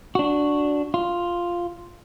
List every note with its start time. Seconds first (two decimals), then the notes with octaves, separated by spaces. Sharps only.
0.15 D4 F#4
0.94 F4